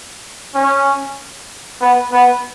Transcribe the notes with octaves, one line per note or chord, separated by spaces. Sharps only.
C#4
B3
B3